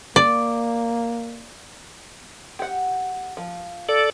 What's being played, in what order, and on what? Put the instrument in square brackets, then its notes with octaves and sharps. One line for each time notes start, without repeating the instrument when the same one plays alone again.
[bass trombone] A#3 [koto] D5
[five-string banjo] G4 F#5
F3
[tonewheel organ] A4 D5